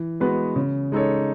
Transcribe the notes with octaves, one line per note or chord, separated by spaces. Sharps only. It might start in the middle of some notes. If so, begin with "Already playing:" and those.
Already playing: E3
G#3 B3 F#4 B4
C#3
G#3 D#4 A4 C#5